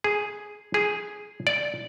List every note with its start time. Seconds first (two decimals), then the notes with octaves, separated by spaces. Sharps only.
0.04 G#4
0.74 G#4
1.47 D5